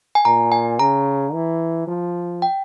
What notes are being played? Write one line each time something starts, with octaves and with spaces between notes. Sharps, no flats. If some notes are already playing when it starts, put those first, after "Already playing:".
G#5
A#2 A#5
G#5
C#3 A#5
E3
F3
G5